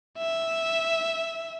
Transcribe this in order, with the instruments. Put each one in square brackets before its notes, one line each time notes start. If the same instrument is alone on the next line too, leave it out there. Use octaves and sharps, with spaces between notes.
[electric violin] E5